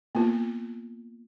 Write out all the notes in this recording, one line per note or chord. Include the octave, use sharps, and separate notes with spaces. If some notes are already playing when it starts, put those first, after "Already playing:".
A#3 B3 F4